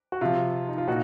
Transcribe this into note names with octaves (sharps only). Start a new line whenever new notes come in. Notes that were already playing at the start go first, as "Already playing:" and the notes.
F#4
C3 F3 F4
D#4
F4
A#2 D#4 F#4